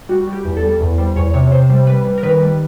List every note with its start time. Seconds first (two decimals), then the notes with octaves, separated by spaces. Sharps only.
0.09 G3 F#4
0.27 G3
0.33 G4
0.45 E2
0.57 A4
0.63 G3
0.80 E2
0.98 G3 C5
1.16 E2 C#5
1.34 C3 C#5
1.52 C3 C5
1.70 G3
1.87 G3 B4
2.05 G3
2.18 A#4
2.23 D#3 B4
2.41 G3